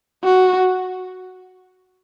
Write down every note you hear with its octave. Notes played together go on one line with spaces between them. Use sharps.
F#4